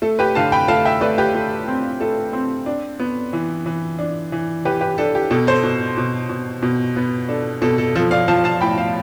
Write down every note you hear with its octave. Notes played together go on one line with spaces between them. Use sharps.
A3 A4
G4 B4
D3 F5 A5
G5 B5
A3 F5 A5
E5 G5
A3 B4 D5
G4 B4
A3
C4
A3 A4
C4
D4
B3
E3
E3
D4
E3
E3 G4 B4
G4 B4
D4 A4
G4
B2 A4
A4 C5
B2
B2
B2
B2
B3
D4 A4
B2 A4
A4
F3 A4
D5 F5
F3 F5 A5
F5 A5
A2 G5 B5
F5 A5